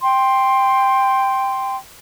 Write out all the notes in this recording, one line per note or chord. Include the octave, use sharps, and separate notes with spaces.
G5 C6